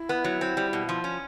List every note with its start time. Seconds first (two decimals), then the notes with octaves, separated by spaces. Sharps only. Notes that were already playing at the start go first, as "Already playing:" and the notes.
Already playing: E4
0.09 B3
0.24 F#3
0.41 C4
0.57 G3
0.73 B2
0.89 F3
1.04 C#4